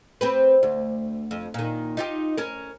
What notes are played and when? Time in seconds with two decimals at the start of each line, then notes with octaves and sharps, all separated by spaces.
0.21 C4 G4 B4
0.63 D2
1.31 F2
1.54 A#2 D#3
1.97 D#4 F4 G4
2.37 C#4 A#4